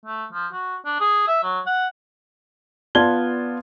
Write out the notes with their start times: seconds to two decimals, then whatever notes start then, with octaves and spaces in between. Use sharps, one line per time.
0.06 A3
0.32 F3
0.53 F#4
0.86 D4
1.00 G#4
1.28 E5
1.43 F#3
1.67 F#5
2.95 B3 F4 D5 A5 G#6 G7